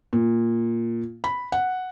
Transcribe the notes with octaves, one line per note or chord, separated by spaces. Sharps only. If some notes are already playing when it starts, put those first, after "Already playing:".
A#2
B5
F#5